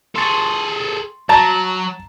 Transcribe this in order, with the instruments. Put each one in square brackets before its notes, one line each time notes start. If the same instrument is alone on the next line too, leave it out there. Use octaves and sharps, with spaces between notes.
[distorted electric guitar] G#4 A4 [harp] C6 C#6 A6
[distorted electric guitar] F#3 [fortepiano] A5 [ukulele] A#5